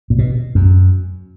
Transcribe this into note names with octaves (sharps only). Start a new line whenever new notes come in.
A#2
B2
F#2